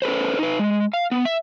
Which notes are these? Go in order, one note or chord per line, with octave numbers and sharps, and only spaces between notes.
C#4 A4 B4 C5
D#4 B4
G#3
F5
B3
E5